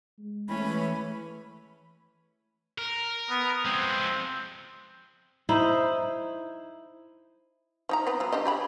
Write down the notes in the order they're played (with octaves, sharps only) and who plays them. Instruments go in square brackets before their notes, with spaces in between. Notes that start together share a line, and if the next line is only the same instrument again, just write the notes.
[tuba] G#3
[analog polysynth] E3 [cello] A3 C#4 [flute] B5
[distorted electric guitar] A#4
[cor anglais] B3
[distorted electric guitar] F3 G#3 [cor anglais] C4
[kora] D#4 E4 C5
[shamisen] F3 D#4 A#5
B3 C4 B4
F3 F#3
D4 G4 D#5
G4 G#4 B5